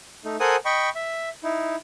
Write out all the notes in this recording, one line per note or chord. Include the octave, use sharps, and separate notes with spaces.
A3 D#4
A4 A#4 C5 F#5 G#5 D#6
D#5 G5 B5 C#6
E5
D#4 E4